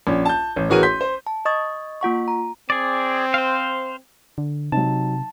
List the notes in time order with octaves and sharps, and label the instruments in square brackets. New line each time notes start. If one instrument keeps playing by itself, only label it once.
[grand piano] A#1 C#4
A5 G6
A1
A1 E3 F#4 G#4 A#4 D#7
C6 G6 B6
C5
[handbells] A5
D#5 C#6 D#6 A6
A#3 F4 F#5 C#6
A#5
[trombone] C4 [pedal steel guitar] G#4 D5
[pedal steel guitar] C5 F5
[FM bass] D3
[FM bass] C3 [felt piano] F#3 D#4 [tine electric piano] A5